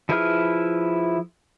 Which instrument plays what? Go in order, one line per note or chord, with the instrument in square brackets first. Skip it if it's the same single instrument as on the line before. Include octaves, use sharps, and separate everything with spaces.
[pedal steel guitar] F3 E4 G#4 B4 F6